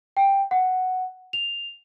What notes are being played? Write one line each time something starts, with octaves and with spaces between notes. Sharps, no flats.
G5
F#5
F7